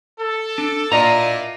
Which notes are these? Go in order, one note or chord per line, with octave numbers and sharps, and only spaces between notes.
A4
D4
A#2 D4 E4 F4 D#5 A#5